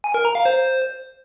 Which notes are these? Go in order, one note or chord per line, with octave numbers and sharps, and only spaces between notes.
G#5
A#4
A#5
F5
C5